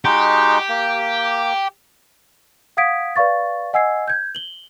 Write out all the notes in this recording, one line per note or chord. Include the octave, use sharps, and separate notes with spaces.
G#3 D#4 F#4 G4
A#3
F5 F#5 D#6 G#6 B6 D7
B4 D5 F5 C#6 A6
D#5 F#5 G#5 E6 G#6 C7
G6 G#6
F#7 G7